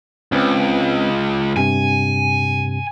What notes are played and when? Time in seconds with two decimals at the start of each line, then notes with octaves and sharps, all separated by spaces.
0.32 C#2 C4 C#4 B4
1.57 G2 C3 G#5